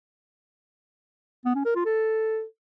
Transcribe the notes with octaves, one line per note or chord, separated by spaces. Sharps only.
B3
C#4
A#4
F4
A4